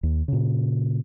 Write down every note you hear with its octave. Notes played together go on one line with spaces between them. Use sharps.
D#2
A#2 C#3